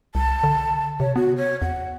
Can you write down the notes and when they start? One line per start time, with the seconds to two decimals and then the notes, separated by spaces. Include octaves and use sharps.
0.15 C2 A5
0.43 D3
1.00 C3 C#5
1.16 B3 F#4
1.37 C#5
1.62 E2 F#5